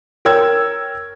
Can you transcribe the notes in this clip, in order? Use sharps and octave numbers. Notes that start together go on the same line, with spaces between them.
A#4 C#5 G5 E6 G#6